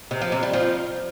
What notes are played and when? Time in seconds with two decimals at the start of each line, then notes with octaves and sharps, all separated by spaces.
0.11 C3
0.21 F3
0.32 C3
0.43 G3
0.53 F3